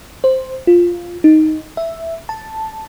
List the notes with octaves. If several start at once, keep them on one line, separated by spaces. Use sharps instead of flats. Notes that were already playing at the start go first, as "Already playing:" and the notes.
C5
F4
D#4
E5
A5